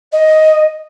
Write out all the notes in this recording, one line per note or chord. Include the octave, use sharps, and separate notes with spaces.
D#5